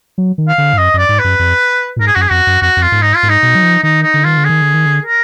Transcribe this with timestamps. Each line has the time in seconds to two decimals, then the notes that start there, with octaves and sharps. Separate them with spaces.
0.18 F#3
0.38 D#3
0.49 F5
0.58 D3
0.73 G#2
0.78 F#2 D#5
0.94 F#2 D5
1.09 G#2
1.19 B4
1.24 F#2
1.39 F2
1.96 A#2
2.00 G#2 A#4
2.07 G#4
2.15 F#2 F#4
2.21 G#4
2.30 F2 F#4
2.47 F#2
2.61 F2 F#4
2.77 F2
2.82 F4
2.92 G#2
3.02 D#4
3.16 F4
3.23 G#2
3.29 D#4
3.43 B2
3.55 F#3
3.63 F3
3.83 D#3 D#4
4.03 D#4
4.14 D3
4.24 D#3 F4
4.37 D3
4.45 D#3 G#4
4.62 D3
4.74 D#3
4.86 D3
5.05 A#4